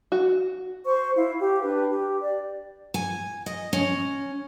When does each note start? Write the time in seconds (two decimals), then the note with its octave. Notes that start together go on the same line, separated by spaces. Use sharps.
0.12 F#4
0.86 C5 C#6
1.17 E4 F5
1.41 G4
1.61 D4 G4 B4
1.90 G4
2.21 D5
2.94 G#5
3.46 D#5
3.73 C#4